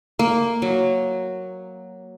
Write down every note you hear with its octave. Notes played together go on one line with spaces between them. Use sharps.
A#3
F#3